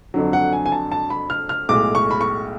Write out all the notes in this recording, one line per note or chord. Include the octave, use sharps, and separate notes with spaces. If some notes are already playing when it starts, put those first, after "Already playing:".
F2 D3 F#3
F#5
G#5
G#5
A5
A5
B5
F6
F6
B1 A2 G#3 D6
C#6
B5
C#6